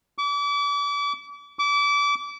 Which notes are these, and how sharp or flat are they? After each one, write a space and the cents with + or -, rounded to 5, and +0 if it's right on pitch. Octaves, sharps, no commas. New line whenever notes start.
D6 -40
D6 -30